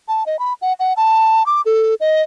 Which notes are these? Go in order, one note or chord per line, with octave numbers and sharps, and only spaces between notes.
A5
D#5
B5
F#5
F#5
A5
D6
A4
D#5